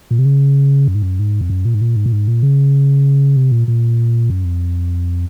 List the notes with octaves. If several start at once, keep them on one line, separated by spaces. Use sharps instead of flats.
A#2
C3
C#3
F#2
G#2
F#2
G#2
F2
F#2
A#2
G#2
A#2
G#2
A#2
G#2
A#2
C#3
C3
A#2
A#2
F#2
F2